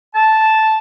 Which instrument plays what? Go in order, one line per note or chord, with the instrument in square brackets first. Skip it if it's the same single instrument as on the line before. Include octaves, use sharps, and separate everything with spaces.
[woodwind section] A5